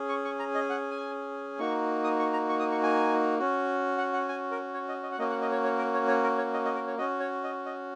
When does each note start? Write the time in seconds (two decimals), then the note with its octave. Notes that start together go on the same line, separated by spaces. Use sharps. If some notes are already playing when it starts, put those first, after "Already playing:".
Already playing: C#4 G#4
0.09 C#6
0.25 C#6
0.39 A#5
0.55 D#5
0.70 F#5
0.91 G#5
1.59 A#3 D#4 F#4 C#6
2.04 D#6
2.19 C#6
2.33 A#5
2.49 C#6
2.59 D#6
2.72 C#6
2.83 G#5
3.39 C#4 F#4
3.98 F#5
4.13 F#5
4.29 G#5
4.51 A#4
4.74 C#5
4.88 D#5
5.03 D#5
5.12 F#5
5.18 A#3 C#4 F#4 D#5
5.30 F#5
5.41 D#5
5.52 C#5
5.64 C#5
5.78 A#4
5.94 C#5
6.08 C#5
6.23 A#4
6.38 C#5
6.54 D#5
6.65 D#5
6.75 A#4
6.87 C#5
6.98 C#4 F#4 D#5
7.20 C#5
7.44 D#5
7.66 D#5